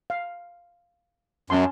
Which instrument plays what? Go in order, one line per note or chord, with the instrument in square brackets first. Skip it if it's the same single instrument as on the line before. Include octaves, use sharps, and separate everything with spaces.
[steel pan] F5
[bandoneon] F#2 [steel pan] C#4 A5 C6